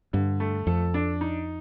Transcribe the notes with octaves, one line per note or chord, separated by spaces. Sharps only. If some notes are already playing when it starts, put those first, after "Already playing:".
G2 D3
A3
F2 A4
D4
D#4